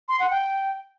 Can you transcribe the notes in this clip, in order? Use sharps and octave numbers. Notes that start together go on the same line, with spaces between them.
C6
F#5
G5